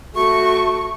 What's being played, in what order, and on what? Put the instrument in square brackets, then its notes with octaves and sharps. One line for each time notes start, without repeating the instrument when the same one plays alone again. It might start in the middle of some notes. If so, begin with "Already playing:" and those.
[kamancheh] A3 C#6 [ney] F#4